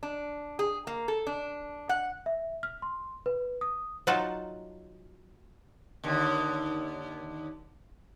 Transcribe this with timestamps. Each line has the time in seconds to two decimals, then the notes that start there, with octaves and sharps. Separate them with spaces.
0.03 D4
0.59 G#4
0.87 A#3
1.08 A4
1.27 D4
1.89 F#5
2.26 E5
2.63 F6
2.82 C6
3.26 B4
3.61 D#6
4.07 F#3 D#4 F4 F5 F#5 A5
6.04 D#2 D3